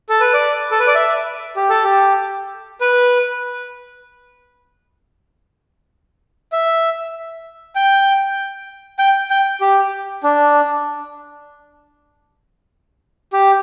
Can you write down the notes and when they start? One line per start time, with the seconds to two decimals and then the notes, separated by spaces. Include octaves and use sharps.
0.09 A4
0.20 B4
0.33 D5
0.71 A4
0.80 B4
0.87 D5
0.95 E5
1.56 G4
1.70 A4
1.84 G4
2.81 B4
6.52 E5
7.76 G5
8.99 G5
9.30 G5
9.61 G4
10.23 D4
13.33 G4